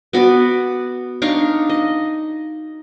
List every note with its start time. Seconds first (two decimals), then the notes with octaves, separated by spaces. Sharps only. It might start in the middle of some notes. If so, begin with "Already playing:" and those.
0.13 B3 F#4 B4 D5
1.22 D4 D#4 F5 C#6
1.69 D#5